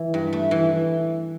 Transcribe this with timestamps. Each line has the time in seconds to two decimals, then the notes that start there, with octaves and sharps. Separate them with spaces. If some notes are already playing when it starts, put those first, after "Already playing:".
Already playing: E3
0.14 G2
0.33 A3
0.51 E3